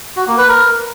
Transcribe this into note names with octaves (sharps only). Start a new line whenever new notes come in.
F#4
A#3
B4
A#4